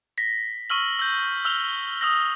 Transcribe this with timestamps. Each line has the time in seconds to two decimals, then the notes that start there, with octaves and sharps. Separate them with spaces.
0.18 A#6 B6
0.70 C#6 E6 F6 F#7
0.99 E6 G6
1.45 E6 F6 F7 G7
2.01 D#6 E6 A#6